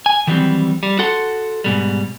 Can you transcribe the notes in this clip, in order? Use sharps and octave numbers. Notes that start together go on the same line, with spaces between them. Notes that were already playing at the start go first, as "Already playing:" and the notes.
G#5
D#3 E3 F#3 G3 A#3 C4
G3
F#4 A4 F#5 C6
G#2 B2 G3